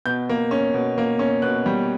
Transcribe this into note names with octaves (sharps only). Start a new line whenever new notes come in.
B2 G6
A#3
C#4
B2
A#3
C#4
B2 F#6
G3